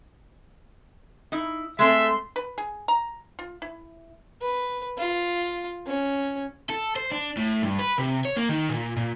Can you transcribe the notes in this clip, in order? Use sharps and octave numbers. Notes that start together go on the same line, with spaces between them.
D#4 E4
G#3 A3 C4 E5 C6
B4
G#4
A#5
F4
E4
B4
F4
C#4
A4
C5
D4
A2
G2
B4
C3
C#5
A#3
D#3
A#2
A#2